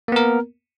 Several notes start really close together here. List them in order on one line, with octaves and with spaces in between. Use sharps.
A#3 B3 A#4